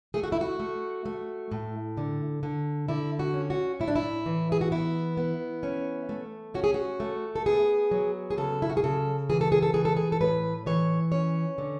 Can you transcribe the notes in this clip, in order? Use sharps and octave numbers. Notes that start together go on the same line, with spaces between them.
A3 G#4
F#4
E4
F#4
A3
A3
A2
D3
D3
D3 E4
F#4
C#4
F#4
A2 E4
D4
E4
E3
G#4
F#4
B3 E4
B3
C#4
A3
C#4 F#4
G#4
F#4
A3
A4
B3 G#4
F#3
G#4
C#3 A4
E4
F#4
G#4
C#3 A4
E3 G#4
A4
G#4
A4
E3 G#4
A4
G#4
A4
A2 B4
E3 C#5
C#4 C#5
D3